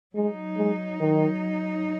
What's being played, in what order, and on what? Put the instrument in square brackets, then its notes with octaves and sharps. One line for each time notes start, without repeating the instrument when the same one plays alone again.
[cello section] F#3 D#4 [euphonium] G#3
[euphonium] G#3
D#3